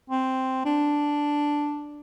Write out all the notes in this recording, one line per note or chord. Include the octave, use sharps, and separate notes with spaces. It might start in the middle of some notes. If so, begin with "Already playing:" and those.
C4
D4